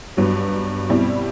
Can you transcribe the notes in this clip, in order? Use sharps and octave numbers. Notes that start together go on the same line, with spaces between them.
G2 F#3 B3
B2 G3 C4 E4